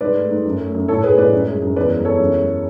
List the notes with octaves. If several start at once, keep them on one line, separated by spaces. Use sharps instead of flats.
G#2 B4 D5
A3
G#2
F#2
A3
F#2
A2 A4 C#5
A3 G#4 B4
A2 B4 D5
F#2
G#3
F#2
E2 B4 D5
G#3
E2 A4 C#5
F#2
G#3